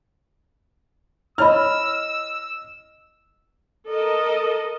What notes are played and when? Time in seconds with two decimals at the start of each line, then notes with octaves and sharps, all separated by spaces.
1.38 E4 C#5 D#5 B5 E6 F6
3.87 A4 A#4 D#5